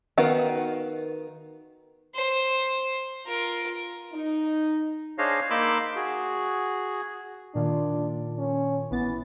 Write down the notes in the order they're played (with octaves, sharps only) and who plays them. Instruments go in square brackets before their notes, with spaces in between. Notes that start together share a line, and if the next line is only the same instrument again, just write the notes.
[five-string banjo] D#3 B3 F#4 F5
[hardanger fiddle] C5
F4 A#4
[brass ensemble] D#4
[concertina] D4 G#4 C5 C#5 D#5 F5
A#3 D#4 B5 C6 D6 E6
F#4 G#4
[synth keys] A#2 D#3 F4 [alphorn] D4
[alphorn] C#4
[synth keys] A1 B3 A6 [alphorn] E3